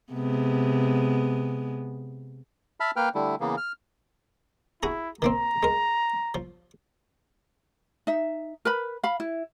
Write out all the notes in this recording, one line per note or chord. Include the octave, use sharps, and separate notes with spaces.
C3 G#3 B3
E5 A5 B5 F6
A#3 B4 G5 F6
D3 G3 A3 E4
C#3 E3 A#3 B3
F6
E4 F#4 G#4 A#5
D#3 A#3 C4 A#5
G#3 A#4
F3
D#4 E5
A#4 B4 B5
F5 B5
E4